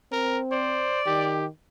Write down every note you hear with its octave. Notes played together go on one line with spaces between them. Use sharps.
C4 A#4
C5 D5
D#3 G4